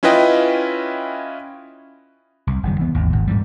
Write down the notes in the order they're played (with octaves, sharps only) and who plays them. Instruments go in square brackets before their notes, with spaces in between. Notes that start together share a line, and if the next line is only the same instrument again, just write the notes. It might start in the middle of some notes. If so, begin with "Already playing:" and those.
[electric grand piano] C#4 E4 F4 B4 D#5 G5
[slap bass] C2
F#1 D#3 G3
E3 B3
G#1 D#2
G#1 A#2
G#2 E3 G3